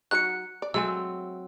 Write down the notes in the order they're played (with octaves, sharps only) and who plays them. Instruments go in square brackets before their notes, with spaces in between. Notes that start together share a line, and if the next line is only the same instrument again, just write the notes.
[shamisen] F#3 D#4 F#4 [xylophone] F#6 C#7
[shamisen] D5
[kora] F#3 C4 [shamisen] G#3 A3 G#5 [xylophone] E6